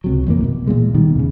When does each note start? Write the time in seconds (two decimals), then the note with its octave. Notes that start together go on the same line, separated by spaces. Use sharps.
0.04 C#2 C3 F#3
0.27 A1 F2 E3 A#3
0.44 B2
0.67 A#2 E3 G#3
0.94 B2 D#3 G3
1.16 E2 C#3